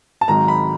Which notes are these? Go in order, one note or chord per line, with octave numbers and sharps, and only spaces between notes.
A5
G#1 G#2 D#3 F#3 A#5
B5